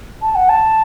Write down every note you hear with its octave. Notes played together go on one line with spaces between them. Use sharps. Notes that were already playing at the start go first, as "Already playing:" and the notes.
A5
F#5
A5